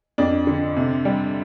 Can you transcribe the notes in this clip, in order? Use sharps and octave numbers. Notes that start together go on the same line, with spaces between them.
F2 D4
D3
C3
G3